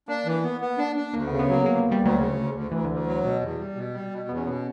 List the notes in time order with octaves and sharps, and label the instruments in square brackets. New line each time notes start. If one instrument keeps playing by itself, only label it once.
[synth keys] A#3 [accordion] D4
[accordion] E3
B3
B3
D4
D4
[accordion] D2 [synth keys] A#3
[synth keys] B3
[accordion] C#3
[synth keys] B3
[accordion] F#3 [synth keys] A#3
[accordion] D2 [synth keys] A#3
[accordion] D2
[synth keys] G3
[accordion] D2 [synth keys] F#3
[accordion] C#3
D2
D2
[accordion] D2 [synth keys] E3
[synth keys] D3
[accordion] D2
[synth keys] D3
[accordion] F#3
B2
E2
G3
B2
G3
B2
[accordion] E2 [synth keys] B3
[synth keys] C#4
[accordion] B2 [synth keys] B3